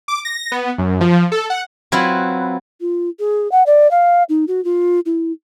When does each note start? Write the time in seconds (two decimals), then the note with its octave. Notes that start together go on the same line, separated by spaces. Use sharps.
0.08 D6
0.25 A#6
0.52 B3
0.78 F#2
1.01 F3
1.32 A4
1.50 F#5
1.92 F#3 C4 E4 F4 B4
2.81 F4
3.19 G#4
3.52 F#5
3.66 D5
3.91 F5
4.29 D#4
4.48 F#4
4.65 F4
5.06 E4